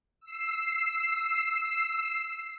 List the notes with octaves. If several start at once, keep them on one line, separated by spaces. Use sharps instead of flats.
E6 C7